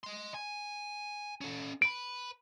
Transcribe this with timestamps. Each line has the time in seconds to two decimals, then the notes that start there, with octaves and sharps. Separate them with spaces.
0.04 D#5 C6
0.34 G#5
1.41 C#4 A4
1.82 B4 B5 D7